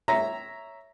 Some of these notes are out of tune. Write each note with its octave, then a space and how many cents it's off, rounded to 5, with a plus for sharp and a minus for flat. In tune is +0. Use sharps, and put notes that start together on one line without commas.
C#5 +0 E5 +0 A#5 +0